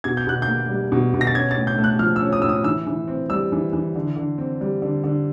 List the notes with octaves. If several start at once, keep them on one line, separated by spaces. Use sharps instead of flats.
B2 G#6
G6
B2 F#6
G6
A#3
G3
B2
B2
A#6
A6
C#4 G#6
A6
A2
G6
A3
F#6
F3 F6
E6
C#4
D#6
A2 E6
D#6
E3 E6
E3
C4
G3 E6
E3
E3
D3
D3
C4
G3
D3
D3